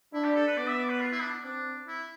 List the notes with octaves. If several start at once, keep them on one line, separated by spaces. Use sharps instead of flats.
D4 E4
G4
A4
B4
B3 D5
E5
D5
B4
F4
E4
D4
C4 D4
E4